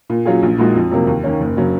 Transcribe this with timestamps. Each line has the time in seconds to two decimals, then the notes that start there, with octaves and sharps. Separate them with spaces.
0.10 A#2
0.25 F#3 C#4 F4 G#4
0.42 A#1
0.58 A#2 G#3 D#4 F#4
0.75 F2
0.91 C3 F#3 A#3
1.07 D#2
1.23 D#3 A#3 C#4
1.40 F#1
1.57 C#3 F#3 C#4